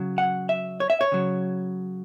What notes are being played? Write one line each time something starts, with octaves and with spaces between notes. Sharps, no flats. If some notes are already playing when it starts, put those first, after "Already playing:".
Already playing: C#3 F#3
F#5
E5
C#5
E5
C#5
C#3 F#3